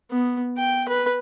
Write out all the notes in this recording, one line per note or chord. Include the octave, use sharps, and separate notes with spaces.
B3
G5
B4